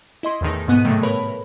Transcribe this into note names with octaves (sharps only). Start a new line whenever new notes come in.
E4 D#5 C6
E2 A2 D#3 D#4
G#2 B2 B3 F#5 F#6 D#7
A2 C3 D#3 F#3 G3 A3
A2 A#4 B4 C#5 B5